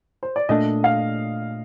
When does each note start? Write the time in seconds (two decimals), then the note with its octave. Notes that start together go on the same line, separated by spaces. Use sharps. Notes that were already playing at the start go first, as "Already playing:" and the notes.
0.23 C5
0.36 D5
0.49 A#2 A3 D4 D#5
0.84 F5